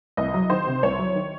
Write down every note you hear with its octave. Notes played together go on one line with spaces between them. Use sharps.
C2 D#5
F#3
D#3 C5
C3
C2 C#5
F#3
D#3